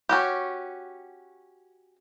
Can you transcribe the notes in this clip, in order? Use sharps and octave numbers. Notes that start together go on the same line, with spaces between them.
C#4 F#4 G4